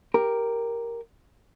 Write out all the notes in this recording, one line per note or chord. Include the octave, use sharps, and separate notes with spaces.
G4 A#4